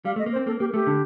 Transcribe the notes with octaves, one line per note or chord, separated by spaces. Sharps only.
G3 F5
A3 D#5
A#3
C5
C4
A#3 A4
A#3 G4
A3 G4
D3